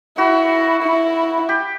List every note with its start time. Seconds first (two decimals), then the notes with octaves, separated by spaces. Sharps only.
0.18 E4 F#4
0.83 E4
1.49 G4